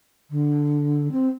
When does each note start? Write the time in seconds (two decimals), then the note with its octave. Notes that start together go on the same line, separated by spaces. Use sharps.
0.30 D3
1.11 C4